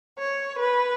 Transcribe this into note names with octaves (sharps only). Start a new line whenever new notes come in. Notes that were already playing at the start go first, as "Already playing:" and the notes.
C#5
B4